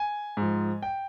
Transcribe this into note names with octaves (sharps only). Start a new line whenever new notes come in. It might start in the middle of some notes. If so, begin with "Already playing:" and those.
Already playing: G#5
G#2 F3
G5